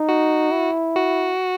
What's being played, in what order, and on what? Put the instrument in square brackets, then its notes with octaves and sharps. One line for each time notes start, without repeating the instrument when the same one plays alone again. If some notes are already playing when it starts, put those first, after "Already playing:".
Already playing: [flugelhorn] D#4
[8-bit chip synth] F#4
[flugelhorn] E4
[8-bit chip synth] F#4